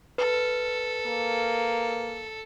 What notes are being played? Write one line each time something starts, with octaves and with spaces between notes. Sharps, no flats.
A4 B4
A#3